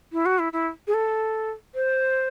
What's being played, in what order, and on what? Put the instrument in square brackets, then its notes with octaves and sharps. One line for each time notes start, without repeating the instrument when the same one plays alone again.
[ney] E4
F#4
E4
E4
G#4
A4
C5